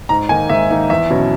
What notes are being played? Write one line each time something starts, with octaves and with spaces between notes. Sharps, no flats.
G#2 A#5
D#3 A#3 D#4 G#5
G#2 E5
D#3 A#3 D#4
E2 E5
B2 F#3 C#4 E4